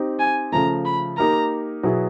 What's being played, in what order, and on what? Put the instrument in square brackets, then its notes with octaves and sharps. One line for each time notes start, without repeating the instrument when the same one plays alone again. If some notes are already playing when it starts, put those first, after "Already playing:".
Already playing: [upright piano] C4 D#4 G4
[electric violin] G#5
[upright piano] C#3 F3 A3 [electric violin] A#5
[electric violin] B5
[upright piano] A#3 D#4 G4 A#4 [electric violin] A#5
[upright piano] B2 F#3 B3 E4 G#4